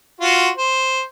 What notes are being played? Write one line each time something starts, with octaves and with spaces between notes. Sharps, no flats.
F4 F#4
C5